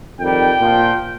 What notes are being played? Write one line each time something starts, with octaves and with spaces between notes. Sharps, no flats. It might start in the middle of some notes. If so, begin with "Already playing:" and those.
F2 D#3 G3 G5
A#2 F3